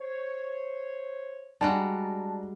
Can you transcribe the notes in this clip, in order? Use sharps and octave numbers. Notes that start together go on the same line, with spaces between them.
C5 C#5
G3 G#3 D4 F#4 A5 A#5